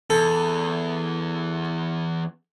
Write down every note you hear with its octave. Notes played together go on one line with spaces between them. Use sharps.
E2 A4